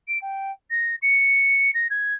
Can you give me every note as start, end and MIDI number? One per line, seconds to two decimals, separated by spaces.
0.08 0.18 98
0.21 0.51 79
0.70 0.95 94
1.02 1.71 97
1.74 1.87 94
1.90 2.14 92